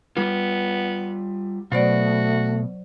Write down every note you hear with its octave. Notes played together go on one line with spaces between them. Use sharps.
G3 B3 F4
B2 F#3 A3 F#4 C5 D5